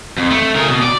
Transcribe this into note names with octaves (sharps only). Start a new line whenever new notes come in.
F2
A3
C#3 A#4
B2
D5